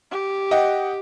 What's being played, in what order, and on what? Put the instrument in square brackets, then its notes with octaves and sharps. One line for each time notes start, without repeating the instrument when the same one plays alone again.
[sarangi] G4
[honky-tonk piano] D#5 F#5 G5